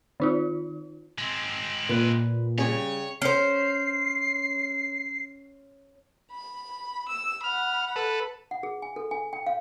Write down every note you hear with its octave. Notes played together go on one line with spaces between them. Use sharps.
D#3 D#4 F4
G#3 C4
A#2 B4
C#3 G3 C#5 G#5
C#4 C5 C7
B5
E6
F#5 B5 F6
A4 B4
F#5
G#4
G#5
A4
G#5
G5
F5